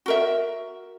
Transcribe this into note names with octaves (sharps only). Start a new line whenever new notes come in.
F#4 A#4 E5